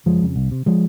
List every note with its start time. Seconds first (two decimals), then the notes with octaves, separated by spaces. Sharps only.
0.06 F#1 F3 G#3
0.22 F2 C#3
0.36 C2
0.51 C3
0.66 F3 G#3